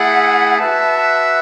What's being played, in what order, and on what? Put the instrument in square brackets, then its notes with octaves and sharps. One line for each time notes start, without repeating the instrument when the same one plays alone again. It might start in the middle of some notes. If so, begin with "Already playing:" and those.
Already playing: [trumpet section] A3 E4 G#4 [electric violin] F#5
[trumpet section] F#4 B4 E5 [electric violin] A5